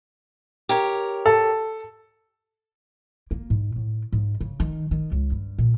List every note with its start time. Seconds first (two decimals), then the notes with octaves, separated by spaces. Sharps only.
0.69 G4 A#4 C#5
1.26 A4
3.31 A#3
3.50 G#2
3.76 A2
4.12 G#2
4.40 C#3
4.60 D#3
4.91 D#3
5.12 C#2
5.32 G2
5.58 A#2